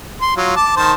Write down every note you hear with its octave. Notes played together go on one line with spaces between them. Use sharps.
C6
F#3 F4
A5 D6
D#3 C5 A5